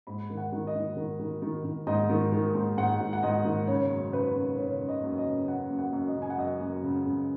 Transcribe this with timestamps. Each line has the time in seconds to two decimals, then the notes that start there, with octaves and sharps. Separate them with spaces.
0.07 G#2 B5
0.30 D#3
0.37 F#5
0.52 D#3
0.67 D#5
0.75 D#3
0.97 D#3
1.19 D#3
1.42 D#3
1.64 D#3
1.87 G#2 D#5
2.09 D#3
2.32 D#3
2.55 G#2
2.77 G#2 F#5
3.00 G#2
3.13 F#5
3.23 G#2 D#5
3.44 D#3
3.67 C#3 C#5
3.90 F#2
4.12 C#3 B4
4.35 C#3
4.57 C#3 C#5
4.80 C#3
4.88 D#5
5.03 F#2
5.18 D#5
5.26 C#3
5.47 C#3 F#5
5.70 F#2
5.79 F#5
5.93 F#2
6.08 D#5
6.16 C#3
6.22 G#5
6.30 F#5
6.38 F#2 D#5
6.61 F#2
6.84 C#3
7.06 C#3